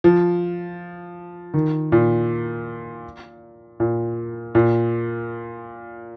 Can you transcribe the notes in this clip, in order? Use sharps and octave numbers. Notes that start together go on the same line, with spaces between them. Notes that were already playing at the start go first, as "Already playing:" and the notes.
F3
D#3
A#2
A#2
A#2